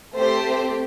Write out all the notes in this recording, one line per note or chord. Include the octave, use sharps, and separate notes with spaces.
A3 C4 G4 C5